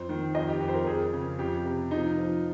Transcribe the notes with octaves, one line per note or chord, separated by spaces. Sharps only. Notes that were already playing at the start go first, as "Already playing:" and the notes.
Already playing: F2 C5
D#3
F2 D#5
G4
F2 G4
C5
A#4
F2 G#4
C#3
F2 G4
C3
F3 D#4
F3